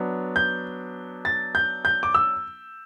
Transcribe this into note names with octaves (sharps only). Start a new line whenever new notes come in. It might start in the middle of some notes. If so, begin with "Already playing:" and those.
Already playing: F#3 B3 D4
G6
A6
G6
G6
D6
E6